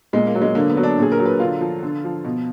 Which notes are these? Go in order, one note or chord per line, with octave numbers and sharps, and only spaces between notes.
A#2 G#3
A#3
F#3
G#3
D3 A#3
B3
F#3
D4
A#2 G#4
A#4
F#3
B4
D3 F4
F3
D3
F3
B2